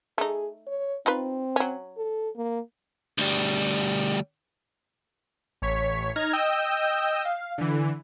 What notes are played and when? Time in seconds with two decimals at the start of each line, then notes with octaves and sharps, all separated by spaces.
0.18 A3 D#4 G#4
0.67 C#5
1.06 C4 D#4 F4 B4
1.56 F#3 C#4
1.97 A4
2.36 A#3
3.18 D2 G3
5.62 A1 C#5 B6
6.16 D#4 F6 G#6 A#6
6.33 D#5 G5 D#6 E6 G6
7.25 F5
7.58 D3 E3